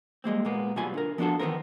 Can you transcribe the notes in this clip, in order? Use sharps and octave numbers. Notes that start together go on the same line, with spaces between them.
G3 G#3 A#3 C4
A#2 G#3 A#3 B3
B2 F#3 G3 F4 G#5 B5
D3 A#4
F3 B3 D4 F4 F#4 A4
D#3 E3 B3 C4 A#4